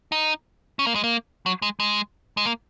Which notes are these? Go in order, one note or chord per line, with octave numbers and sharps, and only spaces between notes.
D#4
C#4
A#3
G#3
A#3
F#3
G#3
G#3
G#3
A#3